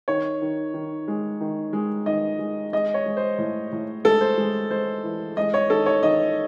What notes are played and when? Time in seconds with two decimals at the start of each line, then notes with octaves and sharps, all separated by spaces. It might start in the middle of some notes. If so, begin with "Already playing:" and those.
0.08 D#3 C#5
0.42 D#3
0.74 D#3
1.08 G#3
1.41 D#3
1.73 G#3
2.06 D#3 D#5
2.39 G#3
2.73 G#3 D#5
2.94 C#5
3.06 G#3
3.17 C5
3.38 A2
3.72 A2
4.05 G#3 A4
4.21 C5
4.37 G#3
4.71 G#3 C5
5.03 E3
5.37 G#3 D#5
5.54 C#5
5.70 D#3 A4
5.86 C#5
6.03 D#3 D#5